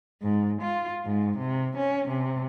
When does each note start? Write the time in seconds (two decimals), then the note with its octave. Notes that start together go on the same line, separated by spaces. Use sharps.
0.22 G#2
0.62 F4
1.05 G#2
1.38 C3
1.77 C#4
2.08 C3